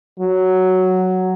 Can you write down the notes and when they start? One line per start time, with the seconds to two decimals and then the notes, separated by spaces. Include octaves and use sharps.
0.20 F#3